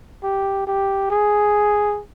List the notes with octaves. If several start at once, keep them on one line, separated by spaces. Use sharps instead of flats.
G4
G4
G#4